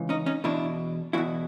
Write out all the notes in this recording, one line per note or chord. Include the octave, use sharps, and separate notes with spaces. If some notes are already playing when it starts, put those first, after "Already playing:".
Already playing: C#2 C#3 E3
C#4 D#4
C#4 D#4
E2 B2 D4 E4
E2 B2 E4 F#4